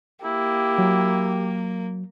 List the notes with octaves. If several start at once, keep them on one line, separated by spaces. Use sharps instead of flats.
A#3 E4 G4
F#3